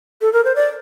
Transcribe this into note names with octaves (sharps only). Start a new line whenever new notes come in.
A4
A#4
C5
D5